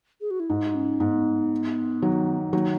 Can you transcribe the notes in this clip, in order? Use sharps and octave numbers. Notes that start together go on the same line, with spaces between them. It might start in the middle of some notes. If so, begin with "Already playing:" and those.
G#4
F#4
E4
G#2 D#4
C#4
G#2 B3
D#3 F#3
D#3 F#3 A#3